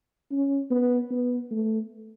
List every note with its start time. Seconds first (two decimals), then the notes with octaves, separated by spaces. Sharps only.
0.32 C#4
0.71 B3
1.11 B3
1.51 A3